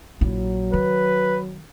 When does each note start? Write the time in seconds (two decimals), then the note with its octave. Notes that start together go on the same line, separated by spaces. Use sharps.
0.21 A#1 F#3 E4
0.73 D#3 B4